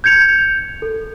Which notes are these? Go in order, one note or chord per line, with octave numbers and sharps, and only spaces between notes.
G6 G#6 C#7 F7
A4